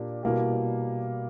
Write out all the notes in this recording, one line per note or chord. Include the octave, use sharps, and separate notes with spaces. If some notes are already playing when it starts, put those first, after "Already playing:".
Already playing: A#2 A#3 D4 G4
B2 G3 A#3 E4 G4